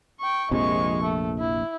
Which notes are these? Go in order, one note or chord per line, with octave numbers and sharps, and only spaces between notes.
G5 C#6
A#1 F2 C3 G#3 C#6
A3
E4